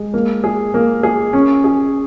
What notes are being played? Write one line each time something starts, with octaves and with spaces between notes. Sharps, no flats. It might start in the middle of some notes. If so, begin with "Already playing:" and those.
Already playing: G#3
A#3
G#4
A#3
G#4
C#4
G#4